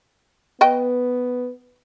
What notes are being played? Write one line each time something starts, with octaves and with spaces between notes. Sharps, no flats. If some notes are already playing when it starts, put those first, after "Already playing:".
B3 B4 D#5 G5